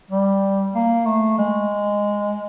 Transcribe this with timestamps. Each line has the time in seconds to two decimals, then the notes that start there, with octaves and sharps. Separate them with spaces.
0.11 G3
0.74 A#3
1.06 A3
1.38 G#3